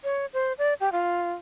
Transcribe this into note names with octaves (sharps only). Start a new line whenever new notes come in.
C#5
C5
D5
G4
F4